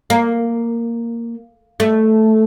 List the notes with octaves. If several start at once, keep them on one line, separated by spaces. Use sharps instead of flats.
A#3
A3